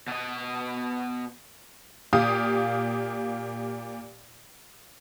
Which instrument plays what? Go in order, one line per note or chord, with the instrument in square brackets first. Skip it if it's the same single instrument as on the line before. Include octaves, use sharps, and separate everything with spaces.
[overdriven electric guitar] B2 D#5
[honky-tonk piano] A#2 G4 F5 D#6